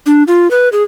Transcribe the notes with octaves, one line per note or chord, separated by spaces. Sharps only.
D4
F4
B4
G#4